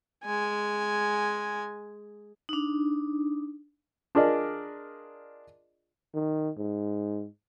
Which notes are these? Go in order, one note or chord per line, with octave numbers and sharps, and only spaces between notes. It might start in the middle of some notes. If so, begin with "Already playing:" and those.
G#3 G#5
D4 D#4
D4 F4 G#4 A#4 D5 D#5
D#3
G#2